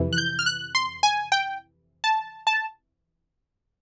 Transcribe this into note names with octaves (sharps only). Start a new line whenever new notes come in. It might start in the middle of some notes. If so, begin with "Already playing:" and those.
Already playing: F2 C3 E3
F#6
G6
F6
F#6
C6
G#5
G5
A5
A5